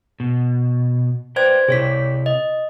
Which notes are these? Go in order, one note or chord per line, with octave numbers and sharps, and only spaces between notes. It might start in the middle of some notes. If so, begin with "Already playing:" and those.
B2
B4 C5 D5 G5 G#6
C3 C4 E4 G#4 C#5 B6
D#5